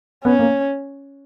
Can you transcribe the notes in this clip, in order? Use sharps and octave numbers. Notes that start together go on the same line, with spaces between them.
B3 C#4
A#3